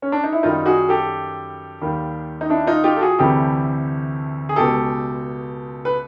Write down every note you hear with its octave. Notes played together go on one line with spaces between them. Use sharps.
C#4
D4
D#4
E4
F#2 D#3 G3 D#4 F4
F#4 G#4
G4 A4
D#2 D#3 G3
D#4
D4 E4
D#4 F4
F4 G4
A4
F#4 G#4
D2 C3 E3 G3 G4 A4
G#4
C#2 B2 G#3 G4 A4
B4